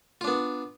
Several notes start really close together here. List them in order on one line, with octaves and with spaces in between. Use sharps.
F4 D4 B3